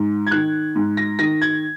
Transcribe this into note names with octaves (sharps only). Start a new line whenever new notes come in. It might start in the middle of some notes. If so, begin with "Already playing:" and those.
Already playing: G#2
G#6
D#3 F#6
G#2
A#6
D#3 A#6
G#6